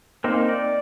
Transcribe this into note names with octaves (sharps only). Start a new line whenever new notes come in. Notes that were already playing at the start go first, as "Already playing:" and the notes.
A#3 C4 D#4
D5